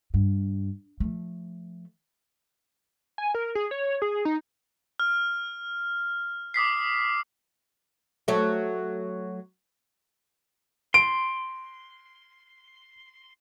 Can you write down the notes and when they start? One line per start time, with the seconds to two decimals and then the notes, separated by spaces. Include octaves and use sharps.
0.14 G2
1.00 F3 A3
3.18 G#5
3.35 A#4
3.55 G#4
3.71 C#5
4.02 G#4
4.25 D#4
5.00 F6
6.54 D6 D#6 B6 C7
8.28 F#3 A3
10.94 C6 D7